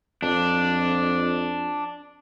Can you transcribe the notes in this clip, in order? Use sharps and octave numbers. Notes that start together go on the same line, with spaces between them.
F2 D4